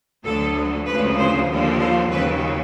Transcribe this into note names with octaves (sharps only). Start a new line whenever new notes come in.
D2 D3 F#3 A4
D2 C#3 F3 B4
C5
D#2 D3 F3
C5
D#2 C#3 F#3 B4